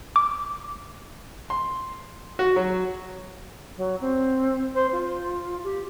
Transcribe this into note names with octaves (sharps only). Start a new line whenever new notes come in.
D6
C6
F#4
F#3
F#3
C4
C5
F4
G4